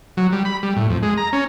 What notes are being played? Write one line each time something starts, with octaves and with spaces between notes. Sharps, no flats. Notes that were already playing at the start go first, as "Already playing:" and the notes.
F#3
G3
B5
G3
A2
F2
G#3
A#5
C#4